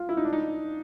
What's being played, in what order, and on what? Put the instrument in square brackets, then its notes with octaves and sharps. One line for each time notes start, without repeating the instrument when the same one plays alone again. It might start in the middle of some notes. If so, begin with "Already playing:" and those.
Already playing: [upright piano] F4
E4
D#4
D4
D#4